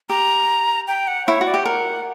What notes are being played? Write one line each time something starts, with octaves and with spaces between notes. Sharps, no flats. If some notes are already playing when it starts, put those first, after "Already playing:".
G4 A#5
G5
F#5
E4 C#5
F#4
D5
G4 G5
A#4 F#5